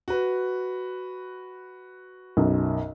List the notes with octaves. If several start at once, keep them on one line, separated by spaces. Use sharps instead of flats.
F#4 B4
B1 F#2